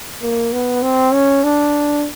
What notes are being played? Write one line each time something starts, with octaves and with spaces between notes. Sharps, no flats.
A#3
B3
C4
C#4
D4